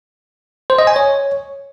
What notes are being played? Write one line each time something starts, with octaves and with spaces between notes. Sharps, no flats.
C5
D#5
G#5
C#5